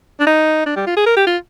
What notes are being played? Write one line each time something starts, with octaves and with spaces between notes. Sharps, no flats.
D4
D#4
D4
G3
F4
G#4
A#4
G4
F4